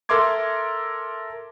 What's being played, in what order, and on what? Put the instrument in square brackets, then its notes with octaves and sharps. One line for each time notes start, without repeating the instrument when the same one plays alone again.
[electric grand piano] A4 A#4 E5 C6 D6 G#6